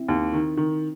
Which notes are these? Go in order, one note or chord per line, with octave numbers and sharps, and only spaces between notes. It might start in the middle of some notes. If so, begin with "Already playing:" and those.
Already playing: C4 E4
D#2
D#3
D#3